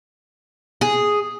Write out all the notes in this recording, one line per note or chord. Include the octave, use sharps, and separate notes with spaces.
G#4